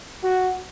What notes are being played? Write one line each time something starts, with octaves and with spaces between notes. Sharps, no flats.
F#4